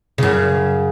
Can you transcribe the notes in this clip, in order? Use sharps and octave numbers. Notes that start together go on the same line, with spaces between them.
F#2 C#3